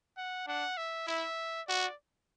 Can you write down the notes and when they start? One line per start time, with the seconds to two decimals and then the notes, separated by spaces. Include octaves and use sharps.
0.17 F#5
0.47 D4 F#5
0.77 E5
1.07 E4 E5
1.68 F#4 D5